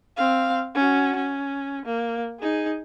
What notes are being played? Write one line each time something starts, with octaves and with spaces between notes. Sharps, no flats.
C4 F5
C#4 F#4
C#4
A#3
D#4 G#4